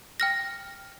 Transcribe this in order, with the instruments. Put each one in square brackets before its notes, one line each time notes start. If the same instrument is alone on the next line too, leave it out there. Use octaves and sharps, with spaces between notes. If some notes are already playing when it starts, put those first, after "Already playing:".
[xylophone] G5 F6 A#6